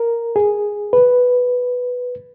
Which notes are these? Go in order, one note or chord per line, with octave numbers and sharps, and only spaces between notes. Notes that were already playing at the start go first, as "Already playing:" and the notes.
Already playing: A#4
G#4
B4